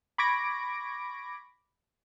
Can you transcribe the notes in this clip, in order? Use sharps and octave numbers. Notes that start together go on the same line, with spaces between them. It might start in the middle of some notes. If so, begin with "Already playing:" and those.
B5 C#6 D6 G#6 A#6 D7